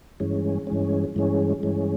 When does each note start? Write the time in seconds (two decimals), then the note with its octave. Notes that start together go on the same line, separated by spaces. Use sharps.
0.20 G2 E3 G#3 C#4
0.67 G2 E3 G#3 C#4
1.16 G2 E3 G#3 C#4
1.63 G2 E3 G#3 C#4